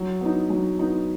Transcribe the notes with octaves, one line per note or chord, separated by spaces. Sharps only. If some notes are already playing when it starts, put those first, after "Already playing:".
Already playing: F#3
B3 D#4
F#3
B3 D#4